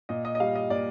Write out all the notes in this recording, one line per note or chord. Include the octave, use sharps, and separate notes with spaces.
A#2 D#5
D#5
D#5
G3 F5
D#5
A#2 D5